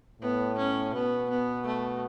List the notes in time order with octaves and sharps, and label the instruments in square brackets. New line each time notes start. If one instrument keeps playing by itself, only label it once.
[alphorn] A2 [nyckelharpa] B3
[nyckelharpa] C#4
[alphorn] B2 [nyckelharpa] B3
[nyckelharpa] B3
A3